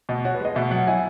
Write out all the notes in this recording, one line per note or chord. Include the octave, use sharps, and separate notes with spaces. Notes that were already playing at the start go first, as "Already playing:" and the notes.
B2 D#5
F#4 C#5
B4
G#3 D#5
B2 E5
F#3 F#5
E4 G#5